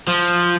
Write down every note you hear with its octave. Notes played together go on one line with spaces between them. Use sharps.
F3